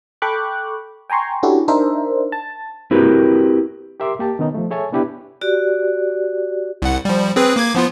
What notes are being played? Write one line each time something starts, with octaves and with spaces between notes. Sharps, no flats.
A4 G5 B5 C#6 D6 F#6
G5 G#5 A#5 C6 C#6
C#4 D4 E4 F#4 G4 A4
D4 D#4 A#4 C5 E5
A5
C4 E4 F#4 G4 A#4 B4
G4 A#4 E5 C6 D6
A#3 G4 A5
D#3 B3 C#4 D#4
F3 A3
G#4 A4 C#5 E5 G#5 A5
B3 D4 E4 G4 B4
F#4 G4 D5
C2 F#5
F3 G3
C4 G#4 B4
A#3 D6 G#6
F3 B3 F4